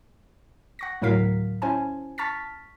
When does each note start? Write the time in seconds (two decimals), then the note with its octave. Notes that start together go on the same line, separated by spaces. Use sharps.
0.79 F#5 C#6 A#6
1.02 D2 A2 F#3 A#4 F5 B6
1.62 C#4 E4 C5 G#5 A5
2.18 A5 C#6 F6 A6 B6